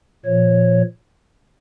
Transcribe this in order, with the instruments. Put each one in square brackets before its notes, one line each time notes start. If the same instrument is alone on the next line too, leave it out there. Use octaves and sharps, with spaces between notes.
[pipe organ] A#2 F3 C#5